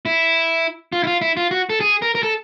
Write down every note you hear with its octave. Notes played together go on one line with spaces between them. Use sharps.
E4
F4
E4
F4
E4
F4
F#4
A4
G#4
A#4
A#4
A4